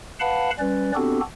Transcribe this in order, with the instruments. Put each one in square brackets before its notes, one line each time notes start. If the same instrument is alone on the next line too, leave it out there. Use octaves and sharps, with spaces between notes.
[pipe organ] B4 F5 F#5 A5 B5
G3 C#4 B4 D5
B3 C4 D4 F#4 G4 A4